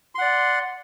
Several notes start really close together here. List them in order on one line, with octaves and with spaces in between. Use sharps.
C6 F#5 D5